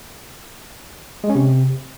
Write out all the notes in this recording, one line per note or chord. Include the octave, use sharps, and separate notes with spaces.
G#3
C#4
C3